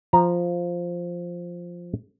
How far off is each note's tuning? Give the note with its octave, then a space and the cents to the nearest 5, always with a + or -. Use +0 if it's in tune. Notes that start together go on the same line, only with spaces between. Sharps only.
F3 +0 A#5 +0